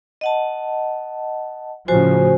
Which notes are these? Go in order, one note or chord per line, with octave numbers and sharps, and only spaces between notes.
D#5 F#5 A5
A2 C#3 F3 F#4 C5 G#5